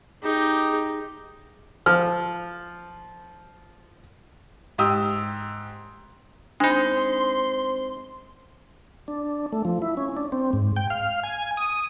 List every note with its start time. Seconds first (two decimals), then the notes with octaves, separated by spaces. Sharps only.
0.23 D#4 G4 G#4
1.86 F3 F6
4.78 G#2 G4 D#6 E6
6.60 G#3 C4 D4 D#4 C5 B5 C6
9.08 D4
9.52 A3
9.65 F3
9.82 E4
9.97 C#4
10.17 D4
10.32 C4
10.53 G#2
10.76 G5
10.90 F5
11.23 G#5
11.57 D#6